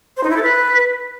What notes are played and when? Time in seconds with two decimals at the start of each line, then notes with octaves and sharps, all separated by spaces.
0.17 C5
0.23 D#4
0.30 E4
0.36 A4
0.43 B4